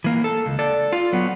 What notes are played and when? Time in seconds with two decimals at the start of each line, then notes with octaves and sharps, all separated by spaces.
0.04 E3 A#3
0.24 A4
0.46 C#2
0.59 A4 D5
0.93 F4
1.13 F#3 B3